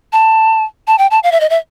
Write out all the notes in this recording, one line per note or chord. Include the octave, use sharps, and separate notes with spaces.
A5
A5
G5
A5
F5
E5
D#5
E5